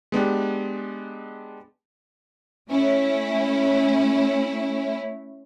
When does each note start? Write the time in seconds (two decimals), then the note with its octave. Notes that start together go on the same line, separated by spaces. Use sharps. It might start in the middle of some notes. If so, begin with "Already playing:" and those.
0.12 G#3 B3 D4 G4
2.69 A3 C#4 E4